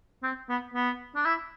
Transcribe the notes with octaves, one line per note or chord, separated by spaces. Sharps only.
C4
B3
B3
D4
E4